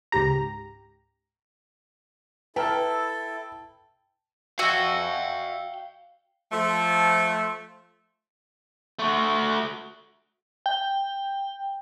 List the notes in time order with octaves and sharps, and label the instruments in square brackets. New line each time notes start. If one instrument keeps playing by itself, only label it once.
[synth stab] C#2 G#2 G4 A#5
[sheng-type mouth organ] E4 A4 [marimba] B4 A#5 F6 [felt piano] G5 A5
[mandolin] F#4 E5 G#5 [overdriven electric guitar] F5 G5
[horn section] F3 A3
[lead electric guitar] A3 F#4
[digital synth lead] G5